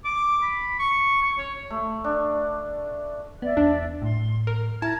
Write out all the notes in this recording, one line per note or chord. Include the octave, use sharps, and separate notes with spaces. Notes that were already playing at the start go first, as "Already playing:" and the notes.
D6
B5
C#6
C#6
C#5
A3
D4
B3 D5 E5
E2 D4
A2 C6
A#4 F6
E4 A5 A#5 F6 G#6